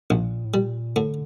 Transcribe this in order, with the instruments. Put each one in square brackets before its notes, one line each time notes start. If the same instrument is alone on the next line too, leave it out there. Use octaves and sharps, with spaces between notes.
[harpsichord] A#1 [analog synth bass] A#2
[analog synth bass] A2
[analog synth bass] A#2 [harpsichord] G3
[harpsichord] A2 [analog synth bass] D3